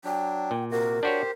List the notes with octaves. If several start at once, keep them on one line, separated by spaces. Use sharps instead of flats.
F#3 D4 G5
A#2
C3 F#4 A#4
D4 F#4 G4 C5 C#5